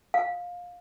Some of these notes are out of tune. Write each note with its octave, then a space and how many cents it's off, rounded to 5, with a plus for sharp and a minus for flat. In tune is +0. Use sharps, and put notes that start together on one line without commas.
F5 +20